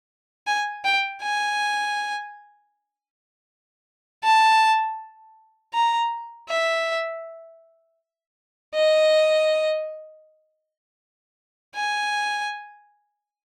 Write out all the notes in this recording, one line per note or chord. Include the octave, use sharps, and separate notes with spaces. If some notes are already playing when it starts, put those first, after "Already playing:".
G#5
G5
G#5
A5
A#5
E5
D#5
G#5